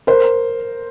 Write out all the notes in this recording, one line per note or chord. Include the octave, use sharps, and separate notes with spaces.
A#4 C5